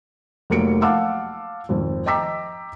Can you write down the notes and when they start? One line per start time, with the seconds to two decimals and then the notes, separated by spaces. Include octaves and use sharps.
0.50 F1 F#3 A#3 G4 C#7 D7
0.82 F5 F#5 A5 D6 E6
1.69 G#1 F2
2.06 D#5 G5 A#5 D6 E6 B6